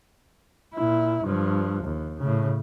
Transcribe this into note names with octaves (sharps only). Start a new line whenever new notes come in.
A#2 E4
G2 F3
D#2
A2 C#3